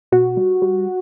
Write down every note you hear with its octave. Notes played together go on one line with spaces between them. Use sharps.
B2 F#4
G3
G3